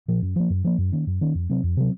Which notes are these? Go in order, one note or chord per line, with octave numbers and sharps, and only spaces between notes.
A#2 F3
F#2
F3 A#3
F#2
F3 A#3
F#2
D#3 A#3 C#4
F#2
D#3 A#3 C#4
F2
C3 F#3 C4
F2
C3 F#3 C4